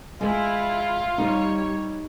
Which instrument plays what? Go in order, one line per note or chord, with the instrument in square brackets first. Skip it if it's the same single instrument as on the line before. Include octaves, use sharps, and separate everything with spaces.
[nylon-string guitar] G#3 [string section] E4 [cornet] F4
[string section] G3 C#5 [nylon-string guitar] D#4